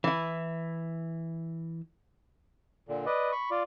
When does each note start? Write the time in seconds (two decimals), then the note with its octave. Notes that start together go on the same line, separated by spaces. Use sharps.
0.04 E3 E4
2.89 A#2 D3
3.06 B4 D5 D#5
3.32 B5 C#6
3.51 F4 D5